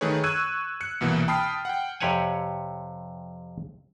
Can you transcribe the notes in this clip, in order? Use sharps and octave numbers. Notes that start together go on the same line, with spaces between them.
D#3 A3 G#4 B4 C#5
C#6 E6 F#6 G#6 D#7
F#6 C#7
C2 B2 E3 A#3
G5 A5 B5 D#6 F6 C7
F#5 G5
F2 C3 G4 C#5 F#5 G#5